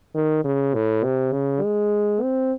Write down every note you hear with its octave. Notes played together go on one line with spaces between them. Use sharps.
D#3
C#3
A2
C3
C#3
G#3
C4